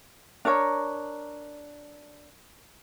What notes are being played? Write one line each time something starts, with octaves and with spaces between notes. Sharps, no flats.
D4 A#4 C#5 A#5